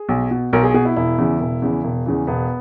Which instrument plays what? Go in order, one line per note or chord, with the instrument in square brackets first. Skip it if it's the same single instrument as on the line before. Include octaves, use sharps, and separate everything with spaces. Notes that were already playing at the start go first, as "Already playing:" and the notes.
Already playing: [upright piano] G#4
B1
B2
B1 A#4
G#4
B2 G#4
E4
E1 E4
E2 C#3 E3
E1
E2 C#3 E3
E1
E2 C#3 E3
E1 B3